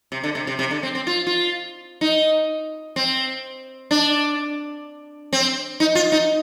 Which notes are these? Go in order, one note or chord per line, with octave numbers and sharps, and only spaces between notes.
C3
D3
C3
C3
C3
D3
C4
C4
F4
F4
D#4
C4
D4
C4
D#4
F4
D#4